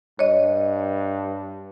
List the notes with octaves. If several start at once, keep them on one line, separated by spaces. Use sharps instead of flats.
G2 C#5 D#5